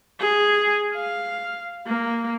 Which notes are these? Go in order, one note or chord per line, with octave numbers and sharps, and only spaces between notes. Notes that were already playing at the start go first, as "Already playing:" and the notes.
G#4
F5
A#3